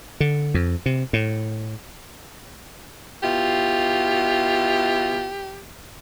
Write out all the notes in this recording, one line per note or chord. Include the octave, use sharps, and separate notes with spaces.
D3
F2
C3
A2
B2 E4 F4 G4